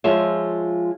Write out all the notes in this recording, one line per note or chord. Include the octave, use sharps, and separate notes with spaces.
F3 G#3 F4 G#4 C#5 E5